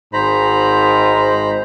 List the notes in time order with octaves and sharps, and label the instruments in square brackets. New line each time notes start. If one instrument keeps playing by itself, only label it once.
[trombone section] G#1 G#2 [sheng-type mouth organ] C5 A#5 B5